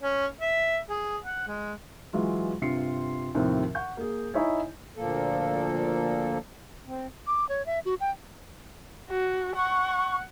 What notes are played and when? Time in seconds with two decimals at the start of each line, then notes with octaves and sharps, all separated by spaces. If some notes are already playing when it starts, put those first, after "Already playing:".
0.03 C#4
0.41 E5
0.90 G#4
1.24 F#5
1.48 G#3
2.13 E3 F#3 G#3 F4
2.62 G2 C3 F4 C6 C7 C#7
3.35 D#2 A2 C3 F3 C4
3.75 F#5 C#6 G6
3.97 A#3 G#4
4.34 D#4 E4 C#5 D#5 E5 G#5
4.97 D2 A#2 F3 A#3 A4
6.87 C4
7.27 D6
7.49 C#5
7.66 E5
7.85 F#4
8.00 G5
9.10 F#4
9.56 F#5 C#6